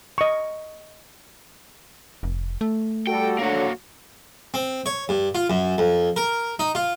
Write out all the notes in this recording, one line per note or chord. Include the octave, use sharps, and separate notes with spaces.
D#5 C#6
F1
A3
G3 F#4 A4 G5
D3 F#3 A#3 F#4
C4
C#5
G2
F4
F#2
F2
A#4
D#4
F4